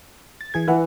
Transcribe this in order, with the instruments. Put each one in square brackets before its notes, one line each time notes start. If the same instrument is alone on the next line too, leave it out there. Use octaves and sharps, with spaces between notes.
[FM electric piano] A6
E3 G#4 G#6
[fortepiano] E3 [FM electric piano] B4 E5 F#5